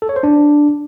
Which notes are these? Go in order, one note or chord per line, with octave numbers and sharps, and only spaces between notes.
A4
C#5
C5
D4